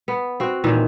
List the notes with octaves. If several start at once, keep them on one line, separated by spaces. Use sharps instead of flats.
B3
C4 F#4
A#2 D#3 E3